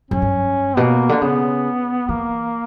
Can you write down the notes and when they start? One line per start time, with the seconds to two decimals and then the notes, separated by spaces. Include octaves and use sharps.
0.11 F#2 C#4
0.22 G2
0.77 B2 A#3
1.09 D3
1.21 C#3 B3
2.09 E3 A#3